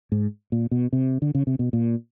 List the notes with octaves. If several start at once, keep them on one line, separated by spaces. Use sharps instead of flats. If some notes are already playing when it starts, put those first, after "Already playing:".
G#2
A#2
B2
C3
D3
C#3
C3
B2
A#2